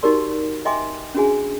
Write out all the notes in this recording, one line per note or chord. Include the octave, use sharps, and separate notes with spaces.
D#4 F#4 G4 A#4 D5 C6
D#5 E5 G5 G#5 C6 D6
C#4 D4 F#4 G#4 G#5